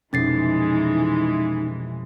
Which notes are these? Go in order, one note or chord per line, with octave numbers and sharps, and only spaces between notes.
F1 B2 E3 G#3 C#4 D#4 A6 C7